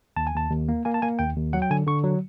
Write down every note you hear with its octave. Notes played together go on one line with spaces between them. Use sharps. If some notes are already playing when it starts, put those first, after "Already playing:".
D#2 A5
G#5
D#2 A5
D#2
A#3
A#3 G#5
A5
A#3 G#5
D#2 G5
D#2
F#3 F#5
G5
D3 G#5
D3 C#6
F#3